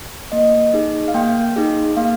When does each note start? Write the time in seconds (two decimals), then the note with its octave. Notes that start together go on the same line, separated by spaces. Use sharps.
0.32 A#3 D#5
0.74 D#4 G#4
1.08 F5
1.14 A#3 G5
1.56 D#4 G#4
1.97 A#3 F5